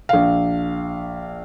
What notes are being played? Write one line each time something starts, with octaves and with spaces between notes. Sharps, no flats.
A#1 F5